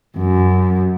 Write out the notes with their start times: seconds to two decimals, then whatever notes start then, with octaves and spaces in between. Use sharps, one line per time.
0.17 F#2